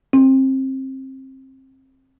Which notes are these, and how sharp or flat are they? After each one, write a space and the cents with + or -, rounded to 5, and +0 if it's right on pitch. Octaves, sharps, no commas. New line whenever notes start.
C4 +25